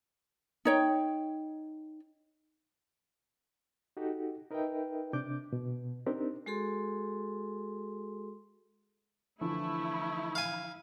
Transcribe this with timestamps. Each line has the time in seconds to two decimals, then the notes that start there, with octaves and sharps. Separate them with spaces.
0.65 D#4 C#5 G5
3.97 D#4 F#4 G4 A4
4.51 D#4 A#4 B4 D#5 E5 G5
5.13 C3 D4 D6 G6
5.53 B2
6.06 C4 D4 D#4 G4 A#4
6.46 G#3 F#4 G#4 A4 C6
9.41 D3 E3 F3 A3 E4
10.35 F5 G#5